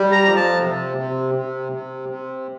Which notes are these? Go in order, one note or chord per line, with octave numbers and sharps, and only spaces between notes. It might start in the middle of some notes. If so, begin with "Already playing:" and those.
Already playing: G3
A#5
F2
A5
C3
C3
C3
C3
C3